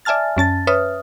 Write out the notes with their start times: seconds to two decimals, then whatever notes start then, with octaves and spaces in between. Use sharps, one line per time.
0.05 D5 E5 G#5 A5 F6 A6
0.37 F#2 C#4 A5 A6
0.67 B4 C#5 E5 D#6 F6